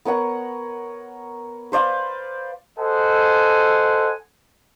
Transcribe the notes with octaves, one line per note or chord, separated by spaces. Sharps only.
B3 A#4 C#5 F#5
B4 C5 D5 F5
A4 C5 D#5 F#5 G#5